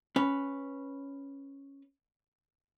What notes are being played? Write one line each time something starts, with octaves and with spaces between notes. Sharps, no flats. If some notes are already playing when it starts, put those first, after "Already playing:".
C#4 B4